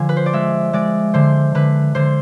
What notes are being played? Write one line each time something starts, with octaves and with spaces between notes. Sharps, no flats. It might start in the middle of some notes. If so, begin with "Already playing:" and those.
Already playing: D3 F3 G#5
B4
C5
D5
G#3 E5
G#3 D5
D3 C5
D3 B4
D3 C5